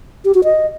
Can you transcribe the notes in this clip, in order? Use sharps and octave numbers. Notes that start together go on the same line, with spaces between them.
G4
F#4
D#5